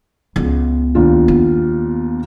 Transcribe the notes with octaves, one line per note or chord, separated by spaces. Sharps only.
C#2 B3
D#2 D4 F4
B3